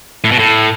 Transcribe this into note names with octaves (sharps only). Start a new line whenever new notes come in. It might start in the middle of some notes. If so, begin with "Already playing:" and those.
A2
B2
A2